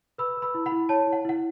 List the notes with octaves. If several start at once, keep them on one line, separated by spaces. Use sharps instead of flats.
B4 B5 E6
B4
B5 E6
E4
F#5 B5
E4
C#5 A5
E4
F#5
E4 F#5